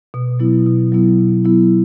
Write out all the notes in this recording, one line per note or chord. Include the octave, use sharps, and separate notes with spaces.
B2
F#3 B3 E4
B2
F#3 B3 E4
B2
F#3 B3 E4